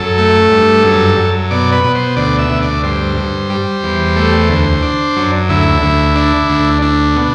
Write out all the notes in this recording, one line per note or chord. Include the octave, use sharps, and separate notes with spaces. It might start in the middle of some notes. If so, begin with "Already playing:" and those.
Already playing: F#2 A4
A3
G2
F#2
F#2
B2 D5
B4
B2
C5
D2 D5
E5
D2
D5
G2 C5
G2
G3
E2
A3
D2
D4
F#2
D2 E4
D2
D4
D2
D4
B2